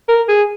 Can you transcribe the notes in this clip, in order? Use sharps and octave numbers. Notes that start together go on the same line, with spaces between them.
A#4
G#4